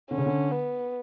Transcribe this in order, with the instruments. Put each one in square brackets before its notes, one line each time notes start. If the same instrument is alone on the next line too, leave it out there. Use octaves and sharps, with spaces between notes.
[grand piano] D3 [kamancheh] C#4
[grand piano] C#3
D3
[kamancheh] B3